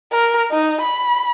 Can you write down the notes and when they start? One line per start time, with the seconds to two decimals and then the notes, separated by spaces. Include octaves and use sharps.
0.12 A#4
0.51 D#4
0.81 B5